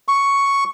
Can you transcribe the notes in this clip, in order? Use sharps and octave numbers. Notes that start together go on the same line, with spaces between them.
C#6